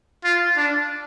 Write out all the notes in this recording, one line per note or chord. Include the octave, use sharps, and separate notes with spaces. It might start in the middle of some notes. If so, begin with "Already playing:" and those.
F4
D4